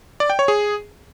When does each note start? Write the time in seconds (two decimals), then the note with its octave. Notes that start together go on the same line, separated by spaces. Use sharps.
0.20 D5
0.30 G5
0.39 C#5
0.48 G#4